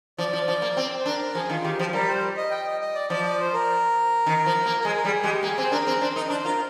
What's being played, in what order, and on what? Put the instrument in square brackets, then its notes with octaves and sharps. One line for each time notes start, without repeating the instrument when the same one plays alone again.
[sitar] F3 [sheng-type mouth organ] D5
[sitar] F3
F3
A#3
C4
[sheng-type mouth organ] C5
[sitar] D4 [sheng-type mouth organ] A#4
[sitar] F3 [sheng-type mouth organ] G#4
[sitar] D#3 [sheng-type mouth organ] F4
[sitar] D#3 [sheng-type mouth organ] G4
[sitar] F3
[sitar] G3 [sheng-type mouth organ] A#4
[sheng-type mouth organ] C5
D#5
G5
D#5
D#5
D5
[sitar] F3 [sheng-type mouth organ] D5
[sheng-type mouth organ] D5
C5
A#4
[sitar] D#3
F3
A#3
[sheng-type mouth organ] A#4
[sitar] G#3 [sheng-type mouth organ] G#4
[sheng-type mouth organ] A#4
[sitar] G3 [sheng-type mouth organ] G#4
[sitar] G#3 [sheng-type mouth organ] G4
[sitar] A#3 [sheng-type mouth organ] G#4
[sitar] C4
[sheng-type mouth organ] C5
[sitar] D4 [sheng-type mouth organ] A#4
[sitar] C4
[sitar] D4 [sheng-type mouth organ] C5
[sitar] D#4 [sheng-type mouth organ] A#4
[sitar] D4 [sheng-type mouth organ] C5
[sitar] F4 [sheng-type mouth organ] A#4